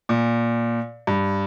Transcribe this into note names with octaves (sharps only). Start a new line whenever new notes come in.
A#2
G2